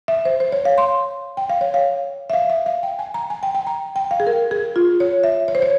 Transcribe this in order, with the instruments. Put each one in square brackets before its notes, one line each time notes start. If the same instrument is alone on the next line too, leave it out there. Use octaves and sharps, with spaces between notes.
[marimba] E5
C5
C5
C#5
F5
C6
G5
F5
C#5
F5
E5
F5
E5
F5
G5
G#5
A#5
G#5
G5
G5
A#5
G5
F5
G#4
A#4
G#4
F4
C#5
E5
C#5
C5
C#5